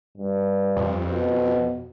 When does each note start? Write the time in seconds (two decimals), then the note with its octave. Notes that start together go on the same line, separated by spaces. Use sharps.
0.18 G2
0.77 F2
1.07 B2